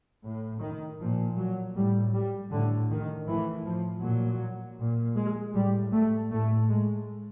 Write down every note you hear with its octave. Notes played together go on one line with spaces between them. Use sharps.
A2
D#3
A#2 F3
F#3
A2 G3
G3
A2 D3
D#3
A2 E3
F3
A#2 F#3
A#2
G#3
A2 G3
A3
A2 A3
G#3